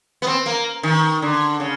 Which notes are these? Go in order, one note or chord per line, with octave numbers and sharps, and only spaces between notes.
B3
C4
A#3
D#3
D3
C#3